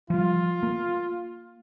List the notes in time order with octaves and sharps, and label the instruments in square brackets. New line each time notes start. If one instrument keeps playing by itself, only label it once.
[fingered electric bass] F3 G3 [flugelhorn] F4
[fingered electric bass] A#3